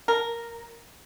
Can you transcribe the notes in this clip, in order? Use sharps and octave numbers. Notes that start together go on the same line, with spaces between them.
A#4